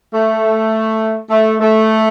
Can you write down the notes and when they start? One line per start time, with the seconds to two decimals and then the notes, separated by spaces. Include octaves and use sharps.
0.13 A3
1.29 A3
1.59 A3